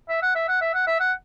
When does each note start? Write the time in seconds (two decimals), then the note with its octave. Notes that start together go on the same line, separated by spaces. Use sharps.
0.09 E5
0.22 F#5
0.36 E5
0.48 F#5
0.61 E5
0.74 F#5
0.87 E5
1.00 F#5